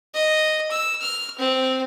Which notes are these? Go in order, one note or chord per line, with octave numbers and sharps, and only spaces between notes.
D#5
E6
F6
C4